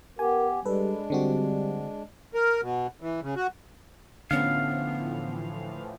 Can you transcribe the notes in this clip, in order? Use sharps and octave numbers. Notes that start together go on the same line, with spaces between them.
B3 G4 A#4 G#5
G3 G#3 D4 A4 B4
D3 G3 C4 F#4
A#4
B2
E3
C#3
F#4
A2 D3 E3 F3 B3 C#4 F5